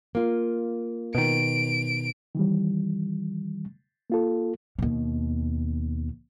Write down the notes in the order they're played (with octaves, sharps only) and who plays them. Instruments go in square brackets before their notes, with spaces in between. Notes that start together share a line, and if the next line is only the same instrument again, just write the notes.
[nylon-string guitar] A#3 F4
[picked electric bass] B2 D#3 [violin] D7
[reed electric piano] D#3 E3 G3
A#3 F4 A4
[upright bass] D#2 B2